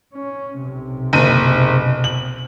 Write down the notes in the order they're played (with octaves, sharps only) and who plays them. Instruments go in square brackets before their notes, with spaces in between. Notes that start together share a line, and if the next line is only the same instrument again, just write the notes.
[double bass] C#4
B1 C3
[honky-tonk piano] F#1 D#7
F#7